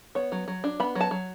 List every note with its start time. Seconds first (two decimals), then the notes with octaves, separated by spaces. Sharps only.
0.15 B3 C#5
0.32 F#3
0.48 F#3
0.64 D4
0.80 B3 B5
0.95 F#3
1.01 A5
1.11 F#3